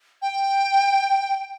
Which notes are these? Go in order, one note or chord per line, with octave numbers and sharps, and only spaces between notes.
G5